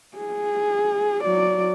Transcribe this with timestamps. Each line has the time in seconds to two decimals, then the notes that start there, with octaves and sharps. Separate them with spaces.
0.17 G#4
1.24 F#3 D5